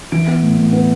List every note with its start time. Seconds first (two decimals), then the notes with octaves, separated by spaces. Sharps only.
0.12 E3 D7
0.27 B3
0.42 A2
0.58 A2
0.73 B3